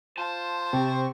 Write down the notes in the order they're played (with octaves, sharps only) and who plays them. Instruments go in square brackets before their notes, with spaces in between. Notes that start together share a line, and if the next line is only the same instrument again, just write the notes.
[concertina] F4 [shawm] C5 [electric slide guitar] A5
[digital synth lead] C3 [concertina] C4 C#6